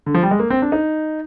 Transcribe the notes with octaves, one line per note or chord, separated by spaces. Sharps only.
D3
F3
G3
G#3
A#3
C4
D4
D#4